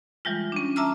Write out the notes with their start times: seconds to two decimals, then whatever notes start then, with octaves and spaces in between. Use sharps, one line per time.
0.25 E3 G3 G#3 F4
0.52 C#4 D4
0.76 E5 A5 A#5 D6 E6 F6